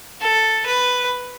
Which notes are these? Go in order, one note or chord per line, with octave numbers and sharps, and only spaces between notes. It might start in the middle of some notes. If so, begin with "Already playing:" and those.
A4
B4